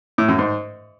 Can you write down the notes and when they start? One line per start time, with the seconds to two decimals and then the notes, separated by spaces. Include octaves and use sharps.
0.18 A2
0.28 F#2
0.39 G#2